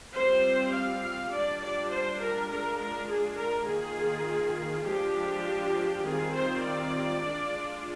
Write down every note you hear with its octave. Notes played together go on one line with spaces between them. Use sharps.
G3 C4 F4 C5
F5
F5
G3 D4 F4 D5
D5
C5
A#4
G#3 D4 F4 A#4
A#4
G#4
A#4
D#3 A#3 F4 G#4
F3 G#3 D4 F4 G4
D#3 G3 C4 F4 G#4
C5
D5
G#3 D4 F4